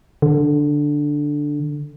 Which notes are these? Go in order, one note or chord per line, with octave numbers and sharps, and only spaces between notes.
D3